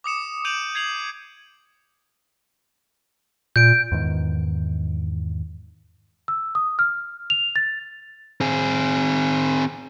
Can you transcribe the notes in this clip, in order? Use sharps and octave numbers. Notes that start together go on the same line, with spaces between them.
D6 D#6 C#7 E7
D#6 G6 D7 D#7 F7 F#7
G#6 C7 F7 F#7
A#2 G6 D7
E2 G#2 D#3
E6
D#6
F6
F7
A6
C4 G#4